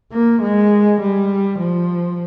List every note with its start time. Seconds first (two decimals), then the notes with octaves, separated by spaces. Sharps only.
0.13 A#3
0.42 G#3
1.01 G3
1.59 F3